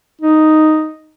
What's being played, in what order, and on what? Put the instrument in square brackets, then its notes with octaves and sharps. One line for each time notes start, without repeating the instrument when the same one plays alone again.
[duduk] D#4